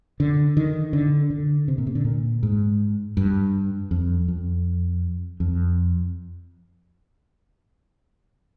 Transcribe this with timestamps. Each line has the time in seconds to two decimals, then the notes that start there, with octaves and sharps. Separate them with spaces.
0.20 D3
0.57 D#3
0.93 D3
1.30 D3
1.68 C3
1.78 A#2
1.87 C3
1.95 D3
2.05 A#2
2.43 G#2
3.17 G2
3.91 F2
4.28 F2
5.40 F2